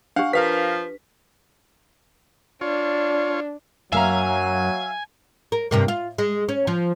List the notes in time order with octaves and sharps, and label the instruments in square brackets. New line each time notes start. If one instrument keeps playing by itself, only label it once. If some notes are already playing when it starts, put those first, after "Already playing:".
[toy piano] D4 G4 [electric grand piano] F5 F#5
[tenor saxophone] F3 [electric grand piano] A#4 F5 B6 [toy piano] B4
[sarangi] D4 [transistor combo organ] F4 C#5
[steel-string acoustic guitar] F#2 A#3 A#5 [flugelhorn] F#3 [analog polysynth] E5 F5 [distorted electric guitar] G#5
[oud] A#4
G2 C3 A#3
F4
G#3
C#4
F3